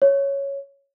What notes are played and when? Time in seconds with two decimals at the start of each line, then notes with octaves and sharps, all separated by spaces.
0.02 C#5